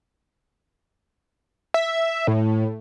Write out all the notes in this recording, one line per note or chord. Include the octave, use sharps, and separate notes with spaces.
E5
A2